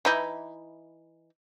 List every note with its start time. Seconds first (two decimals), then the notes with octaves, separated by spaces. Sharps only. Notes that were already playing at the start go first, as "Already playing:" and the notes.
0.05 E3 D#4 E4